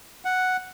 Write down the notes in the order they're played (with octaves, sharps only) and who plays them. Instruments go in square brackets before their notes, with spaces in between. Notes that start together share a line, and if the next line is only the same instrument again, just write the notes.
[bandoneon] F#5